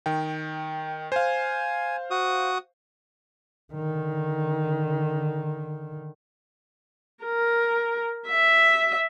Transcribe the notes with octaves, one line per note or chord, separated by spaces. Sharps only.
D#3 G5
C5 F5 G#5
F#4 D#6
D3 D#3
A#4
E5